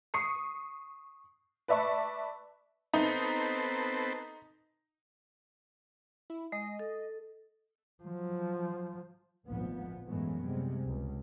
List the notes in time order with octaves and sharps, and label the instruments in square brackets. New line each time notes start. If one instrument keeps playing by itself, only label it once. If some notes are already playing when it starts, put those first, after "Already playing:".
[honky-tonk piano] C#6 D#6 C7 C#7
B4 D5 E5 A5 C#6
[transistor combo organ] B3 C4 A4 [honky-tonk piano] D#4
[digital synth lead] E4
[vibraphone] G#3 [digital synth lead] D#5
[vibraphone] A4
[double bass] F3 F#3
[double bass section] G#1 D2 A#2 F3 B3
G#1 F#2 E3 G#3 A3 B3
C3 G3 G#3
C#2